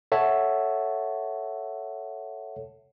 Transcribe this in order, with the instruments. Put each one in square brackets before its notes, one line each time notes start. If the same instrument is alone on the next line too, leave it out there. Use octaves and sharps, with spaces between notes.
[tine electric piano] A4 C#5 E5 F#5 A5